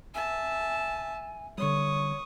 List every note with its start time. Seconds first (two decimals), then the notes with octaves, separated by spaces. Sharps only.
0.14 E5 G#5 A5
1.58 D3 G3 C#5 C#6 D#6